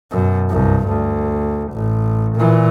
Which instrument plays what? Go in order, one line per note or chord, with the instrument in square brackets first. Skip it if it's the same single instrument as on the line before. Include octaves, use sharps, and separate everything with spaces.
[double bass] F#2 B2
C2 G2
D2
A1
A#2 E3